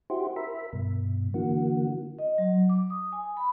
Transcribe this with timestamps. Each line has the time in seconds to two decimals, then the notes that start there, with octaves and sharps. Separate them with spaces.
0.10 E4 F#4 G4 C5
0.36 A#4 E5 B5
0.73 G2 B2
1.34 D3 E3 A#3 F#4
2.19 D#5
2.38 F#3
2.69 D6
2.90 D#6
3.13 G#5
3.37 B5